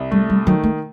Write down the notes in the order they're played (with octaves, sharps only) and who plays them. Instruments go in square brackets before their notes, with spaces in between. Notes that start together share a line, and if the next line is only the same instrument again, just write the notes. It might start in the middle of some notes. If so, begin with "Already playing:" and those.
Already playing: [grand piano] C2
[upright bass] G3 [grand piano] A3
[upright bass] G3
[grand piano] D#3 [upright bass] F#3
[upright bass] A3